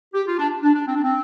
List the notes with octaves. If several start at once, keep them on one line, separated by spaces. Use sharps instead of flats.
G4
F4
D4
D4
D4
C4
D4
C4